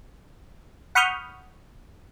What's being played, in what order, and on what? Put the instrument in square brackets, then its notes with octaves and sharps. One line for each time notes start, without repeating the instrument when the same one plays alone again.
[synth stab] F#5 B5 C#6 D#6 F6 G6